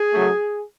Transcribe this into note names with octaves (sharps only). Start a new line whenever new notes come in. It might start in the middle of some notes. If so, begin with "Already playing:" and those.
Already playing: G#4
F#2 C#3 F#3 A3